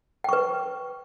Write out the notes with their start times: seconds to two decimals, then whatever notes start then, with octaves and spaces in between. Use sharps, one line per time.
0.24 G5
0.29 C#6
0.33 B4